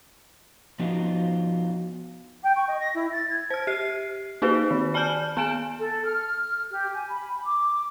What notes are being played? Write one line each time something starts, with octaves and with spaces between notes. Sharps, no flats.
F3 B3 D#4 F4 F#4 D#5
G5
C#6
D#5
A#6
E4
A6
G#6
C5 F6
G4 C7
A#3 D#4 F#4 G#4 B4
D#3
D5 G#5 A5 F6 G6
B3 G#4 G#5 D7 E7
A4
F6
G4
G#5
B5
D6